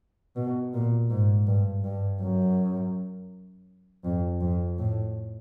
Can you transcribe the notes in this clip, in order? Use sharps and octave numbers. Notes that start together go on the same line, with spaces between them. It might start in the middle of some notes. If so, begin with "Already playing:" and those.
B2
A#2
G#2
G2
G2
F#2
F2
F2
A2